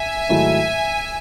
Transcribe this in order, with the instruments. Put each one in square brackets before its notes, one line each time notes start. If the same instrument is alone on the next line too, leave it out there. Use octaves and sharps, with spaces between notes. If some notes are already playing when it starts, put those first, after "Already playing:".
Already playing: [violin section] E5 G#5
[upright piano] G#2 D#3 F#3 A3 E4